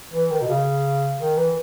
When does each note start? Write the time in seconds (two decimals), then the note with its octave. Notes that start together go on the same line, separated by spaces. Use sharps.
0.14 E3
0.31 D#3
0.42 B2
0.49 C#3
1.19 D#3
1.37 E3